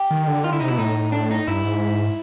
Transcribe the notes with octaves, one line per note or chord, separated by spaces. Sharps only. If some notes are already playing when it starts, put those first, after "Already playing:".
Already playing: G4
D#3
D3
D#3 F4
D3 E4
C3 D#4
B2 E4
A2 D#4
D4
D#4
G2 E4
G#2